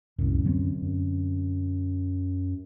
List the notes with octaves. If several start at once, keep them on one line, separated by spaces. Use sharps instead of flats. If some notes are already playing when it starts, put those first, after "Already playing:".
D1 C2 F#2
D3 F#3 C4
F#2